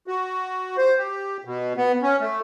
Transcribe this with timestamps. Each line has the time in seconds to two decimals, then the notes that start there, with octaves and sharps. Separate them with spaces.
0.07 F#4
0.77 C5
0.98 G4
1.45 B2
1.77 B3
2.02 C#4
2.20 A3